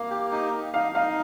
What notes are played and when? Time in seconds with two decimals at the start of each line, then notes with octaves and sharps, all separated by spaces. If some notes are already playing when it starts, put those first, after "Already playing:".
Already playing: A#3 F5
0.10 G4
0.32 D#4
0.53 D#4
0.73 D#4 F5
0.95 D#4 F5